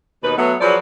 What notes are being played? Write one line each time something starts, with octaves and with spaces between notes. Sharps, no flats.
D#2 B2 D#4 B4
F#3 A3 B3
F3 F#3 G#4 B4 D5